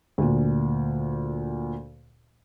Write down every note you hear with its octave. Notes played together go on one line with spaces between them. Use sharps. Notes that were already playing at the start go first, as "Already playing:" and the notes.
D2 A#2